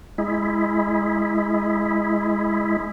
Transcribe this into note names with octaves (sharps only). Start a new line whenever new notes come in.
G#3 E4